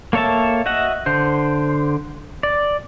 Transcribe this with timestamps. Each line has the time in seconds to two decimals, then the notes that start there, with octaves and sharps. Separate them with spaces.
0.13 A#3 A4 C#5 E5 A5
0.66 F#4 D#5 E5 F#5
1.06 D3 C5
2.43 D5